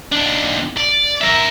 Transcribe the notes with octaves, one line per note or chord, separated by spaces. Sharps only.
D#2 D4
D5
A#4 E5